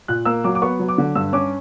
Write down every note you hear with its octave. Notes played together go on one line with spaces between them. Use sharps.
A#2 F#6
A#3 E6
F#3 D6
D6
B3 C#6
F#3
D6
D3
G2 E6
C#4 D6